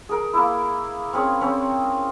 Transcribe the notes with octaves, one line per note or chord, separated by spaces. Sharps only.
G#4 A#4
A#3 E4
C4 C#4 G#4
C4 C#4